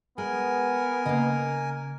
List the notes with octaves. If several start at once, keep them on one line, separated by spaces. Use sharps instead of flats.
G#3 B3 A#4 G#5
C#3 A#3 D#5